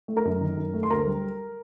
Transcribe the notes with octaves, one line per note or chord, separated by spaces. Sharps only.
A3
A#4 A#5
F#2
D#3
F#2
A3
C6
D2 A#4 A#5
G3